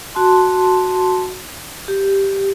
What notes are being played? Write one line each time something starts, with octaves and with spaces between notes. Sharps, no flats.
F#4 A5 C6
G4